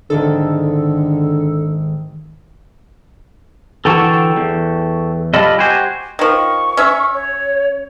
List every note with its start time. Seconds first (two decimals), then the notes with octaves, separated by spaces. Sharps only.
0.10 G#1 D3 D#3 A4 A5
3.85 D3 E3 F#3 A4 G5 C#6
4.37 E2
5.34 G3 F4 A4 D#5 B5
5.59 F#4 G4 C5 G#5
6.19 D#3 F3 C#6
6.77 C#4 E5
7.14 C#5